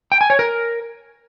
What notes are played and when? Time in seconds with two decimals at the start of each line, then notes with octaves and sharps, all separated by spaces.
0.12 G5
0.21 G#5
0.30 C#5
0.39 A#4